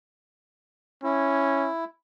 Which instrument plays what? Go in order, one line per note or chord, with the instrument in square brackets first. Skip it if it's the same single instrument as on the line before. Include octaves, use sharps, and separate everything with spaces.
[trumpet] C#4 [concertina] E4